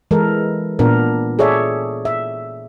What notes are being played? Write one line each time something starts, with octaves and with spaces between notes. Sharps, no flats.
E3 G#3 A4 A#4
A#2 B3 D4 A#4
G#4 A4 C#5 D5 E5
E5